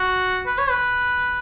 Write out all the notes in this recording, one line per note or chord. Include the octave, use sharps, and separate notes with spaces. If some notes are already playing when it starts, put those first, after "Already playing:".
Already playing: F#4
B4
C#5
B4